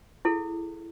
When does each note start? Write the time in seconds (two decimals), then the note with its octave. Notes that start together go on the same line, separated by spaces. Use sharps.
0.25 E4 G#4 A4